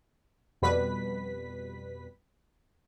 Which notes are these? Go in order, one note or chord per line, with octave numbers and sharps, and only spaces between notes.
F2 B2 G3 B4 B6